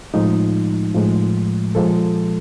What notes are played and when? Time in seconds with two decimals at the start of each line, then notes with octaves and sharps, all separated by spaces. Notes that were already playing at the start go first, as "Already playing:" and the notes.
0.14 A2 F3 G#3 D#4
0.94 A2 F3 G#3
1.75 A#2 F3 G#3 A4